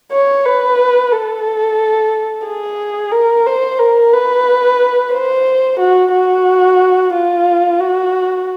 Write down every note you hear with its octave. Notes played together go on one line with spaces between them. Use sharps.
C#5
B4
A4
G#4
A#4
C5
A#4
B4
C5
F#4
F#4
F4
F#4